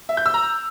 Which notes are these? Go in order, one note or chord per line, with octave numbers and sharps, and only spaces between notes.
E5
G6
E6
A#5